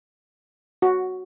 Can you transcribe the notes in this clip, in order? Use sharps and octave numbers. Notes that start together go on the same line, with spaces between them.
F#4